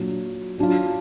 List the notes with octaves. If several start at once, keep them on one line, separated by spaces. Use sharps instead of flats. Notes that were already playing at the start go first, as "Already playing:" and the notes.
Already playing: A#2 F#3 D4 F4
F#3 D4 F4